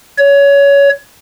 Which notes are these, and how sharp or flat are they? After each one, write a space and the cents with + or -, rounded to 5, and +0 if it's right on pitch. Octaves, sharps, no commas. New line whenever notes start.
C#5 +20